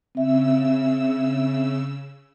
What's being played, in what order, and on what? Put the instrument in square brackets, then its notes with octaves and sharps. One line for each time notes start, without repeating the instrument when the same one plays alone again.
[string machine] C#3 E6 [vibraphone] C4 E5